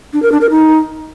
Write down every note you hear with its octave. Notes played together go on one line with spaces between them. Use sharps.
D4
A#4
D4
A#4
D#4